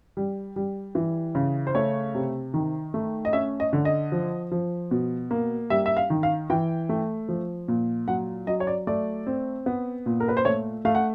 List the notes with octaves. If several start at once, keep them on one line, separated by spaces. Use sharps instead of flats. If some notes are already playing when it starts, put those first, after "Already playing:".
G3
G3
E3
C#3
C5
A3 C#5
C3
D#3
A3
D#5
C#4 E5
D#5
D3
D#5
F3
F3
B2
A#3
G3 E5
E5
F5
D#3
F5
E3 G5
A3
F3
A#2
F#3 F#5
F#3 D#5
C#5
D5
A3 D5
C4
B3
A#2
A#4
B4
C5
A3 C#5
A3 F5
F#5